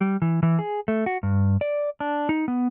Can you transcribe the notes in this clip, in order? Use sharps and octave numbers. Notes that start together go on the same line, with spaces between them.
G3
E3
E3
G#4
A3
F#4
G2
D5
D4
D#4
B3